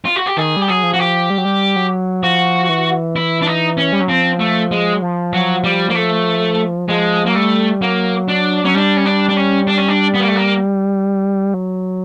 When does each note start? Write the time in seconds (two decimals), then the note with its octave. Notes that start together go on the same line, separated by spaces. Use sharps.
0.05 F4
0.16 F#4
0.26 G4
0.37 D#3 G#4
0.57 G3 G4
0.68 F#3 G#4
0.83 F3
0.94 F#4
0.99 G4
1.30 G3
1.38 F#3
1.45 G3
1.76 F#3
2.23 F3 F#4
2.69 E3
3.16 E4
3.42 D4
3.47 D#4
3.78 C#4
3.93 G3
4.01 F#3
4.09 F3 C4
4.40 A3
4.71 G#3
4.94 F#3
5.02 F3
5.33 F#3
5.64 G3
5.89 A#3
5.95 A3
6.88 F3 G#3
7.26 F#3 A#3
7.35 G3 A3
7.81 F#3 A#3
8.28 D4
8.64 F#3 C#4
8.75 G3 D4
8.97 C#4
9.05 D4
9.29 D4
9.36 C#4
9.67 D4
9.78 C#4
9.88 D4
10.14 B3
10.21 A#3
10.28 A3
10.35 A#3
11.54 F#3